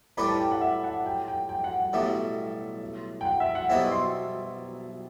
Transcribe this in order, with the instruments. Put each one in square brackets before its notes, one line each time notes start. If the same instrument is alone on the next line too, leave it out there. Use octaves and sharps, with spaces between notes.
[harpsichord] A2 G3 D4 G4 B4 [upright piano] B5
[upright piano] A5
G5
F#5
E5
F#5
G5
G5
G5
F#5
F#5
[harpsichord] B1 A2 G3 [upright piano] E5
[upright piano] G5
F#5
E5
F#5
[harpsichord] B1 B2 G3 C4 E4 [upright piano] E5
[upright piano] C6